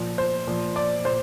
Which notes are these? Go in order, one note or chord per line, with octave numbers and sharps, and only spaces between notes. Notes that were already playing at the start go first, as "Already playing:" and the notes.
Already playing: A#2 F3
C5
A#2 F3
D5
A#2 C5